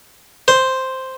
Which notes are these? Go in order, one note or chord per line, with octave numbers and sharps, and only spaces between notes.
C5